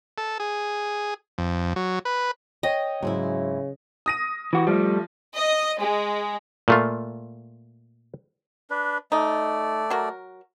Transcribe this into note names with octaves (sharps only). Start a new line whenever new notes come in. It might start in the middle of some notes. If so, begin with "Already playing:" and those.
A4
G#4
F2
F#3
B4
C#5 D#5 G5
G#2 C#3 F#3 C4 E4
D#6 A#6 D#7
E3 F#4 G4
F3 G3 A3
D#5
G#3
A#2 A3 F4
D4 B4
A3 D#4 D5
F#3 F#4 A#4